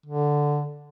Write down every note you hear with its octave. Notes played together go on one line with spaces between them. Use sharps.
D3